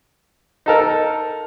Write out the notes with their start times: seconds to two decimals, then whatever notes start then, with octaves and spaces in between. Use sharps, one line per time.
0.66 D#4 A4 A#4